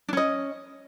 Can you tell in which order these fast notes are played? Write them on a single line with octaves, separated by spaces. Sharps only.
D4 C#4 D#5